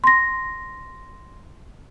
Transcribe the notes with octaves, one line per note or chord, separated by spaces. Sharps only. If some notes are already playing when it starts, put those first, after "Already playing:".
C6 A#6